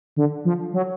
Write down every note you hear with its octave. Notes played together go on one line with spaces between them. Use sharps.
D3
F3
F#3